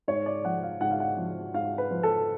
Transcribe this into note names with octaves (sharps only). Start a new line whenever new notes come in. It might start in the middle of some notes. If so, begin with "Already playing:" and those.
G#2 C#5
D5
F3 F#5
F5
G#2 F#5
F5
F#5
F3
G#2 F5
B4
F3
A4